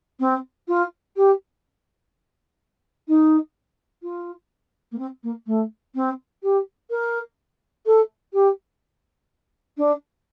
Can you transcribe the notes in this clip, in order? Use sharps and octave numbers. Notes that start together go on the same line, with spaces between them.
C4
F4
G4
D#4
F4
A#3
C4
A#3
A3
C4
G4
A#4
A4
G4
D4